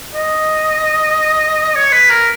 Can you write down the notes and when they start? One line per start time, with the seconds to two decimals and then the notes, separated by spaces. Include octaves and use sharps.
0.14 D#5
1.75 C#5
1.92 B4
2.10 A#4